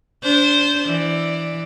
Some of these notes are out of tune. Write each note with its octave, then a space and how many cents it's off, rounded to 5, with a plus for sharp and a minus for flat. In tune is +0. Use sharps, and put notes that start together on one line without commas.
D4 -25 C5 -5
E3 +0 D5 +0